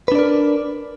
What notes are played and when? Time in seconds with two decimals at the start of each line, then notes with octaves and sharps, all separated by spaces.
0.08 B4
0.12 D4
0.15 D5
0.19 A#4